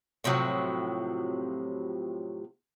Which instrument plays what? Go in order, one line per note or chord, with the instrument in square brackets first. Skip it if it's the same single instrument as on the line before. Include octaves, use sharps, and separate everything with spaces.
[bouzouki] A2 C3 F3 F#3